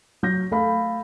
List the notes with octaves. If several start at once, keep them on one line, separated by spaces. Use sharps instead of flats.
F#3 G6 A#6
A3 A4 F5 B5